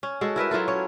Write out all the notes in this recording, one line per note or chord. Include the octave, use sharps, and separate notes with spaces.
C#4
G#3 F#4 A4
E4 A#4 B4 E5
F#3 E4 F4 A4
C#4 C#5